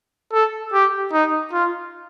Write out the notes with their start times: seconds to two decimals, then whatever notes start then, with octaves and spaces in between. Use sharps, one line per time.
0.33 A4
0.73 G4
1.13 D#4
1.53 F4